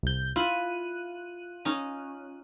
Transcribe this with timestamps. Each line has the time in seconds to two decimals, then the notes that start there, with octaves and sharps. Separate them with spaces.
0.03 C2 G6
0.36 E4 F4 F#6 D#7
1.65 C#4 D#4